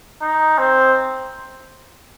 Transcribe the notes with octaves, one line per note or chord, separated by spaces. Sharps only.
D#4
C4